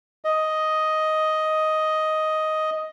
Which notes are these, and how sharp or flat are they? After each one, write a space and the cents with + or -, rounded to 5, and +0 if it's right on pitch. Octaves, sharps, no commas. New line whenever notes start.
D#5 +5